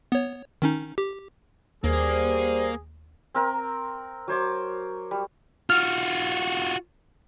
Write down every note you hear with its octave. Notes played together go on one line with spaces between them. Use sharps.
B3 C#5
D#3 C#4 D#4
G4
D#2 G3 A#3 G#4 C5
C4 A#4 A#5
F#3 C5 C#5 D6
G3
F4 F#4 F6